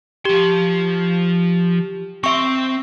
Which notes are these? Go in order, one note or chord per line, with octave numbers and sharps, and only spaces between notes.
F3 G4 C6
C4 E5 C6 C#6